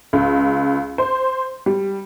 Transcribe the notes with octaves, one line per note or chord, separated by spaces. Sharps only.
C#2
C5
G3